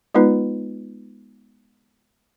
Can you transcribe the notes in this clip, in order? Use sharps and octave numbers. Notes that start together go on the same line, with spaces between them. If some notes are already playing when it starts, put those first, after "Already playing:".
G#3 B3 D#4 F4 B4